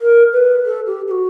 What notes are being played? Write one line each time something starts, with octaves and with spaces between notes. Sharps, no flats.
A#4
B4
A4
G4
G4
F#4